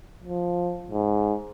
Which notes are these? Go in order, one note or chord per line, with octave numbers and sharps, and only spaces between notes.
F3
G#2